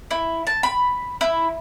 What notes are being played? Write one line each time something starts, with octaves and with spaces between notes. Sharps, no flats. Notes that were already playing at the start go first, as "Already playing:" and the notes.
E4
A5
B5
E4